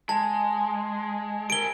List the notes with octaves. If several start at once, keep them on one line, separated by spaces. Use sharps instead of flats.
G#3 A5
G#4 A#4 D7 G7